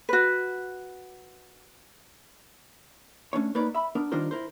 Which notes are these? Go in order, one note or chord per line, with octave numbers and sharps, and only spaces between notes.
F#4 B4
A3 C#4 D4 C#5
A#3 D#4 A#4 B4 C#5 D5
E5 B5
B3 D4 A#4
D#3 G3 D4 F4 A#4 C5
E4 A#4 C5